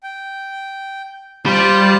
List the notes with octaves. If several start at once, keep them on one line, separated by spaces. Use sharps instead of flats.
G5
G3 F4 C5 A5